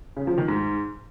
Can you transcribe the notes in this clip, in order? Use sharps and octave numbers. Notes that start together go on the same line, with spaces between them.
C#3
F3
D#3
G#2